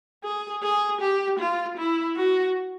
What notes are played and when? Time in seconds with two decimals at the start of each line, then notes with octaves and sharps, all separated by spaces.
0.24 G#4
0.63 G#4
1.01 G4
1.39 F4
1.78 E4
2.16 F#4